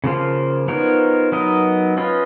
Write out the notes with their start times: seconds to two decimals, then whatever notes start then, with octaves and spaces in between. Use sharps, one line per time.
0.04 C#3 F3 A#3 F4
0.68 F3 B3 D#4 A#4 C#5
1.32 F#3 B3 D#4 A#4 D#5
1.97 C#4 F4 B4 D#5